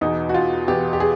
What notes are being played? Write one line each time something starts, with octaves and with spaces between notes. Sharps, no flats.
E2 B2 D#4
F#4
F4
E2 B2 G4
G4
G#4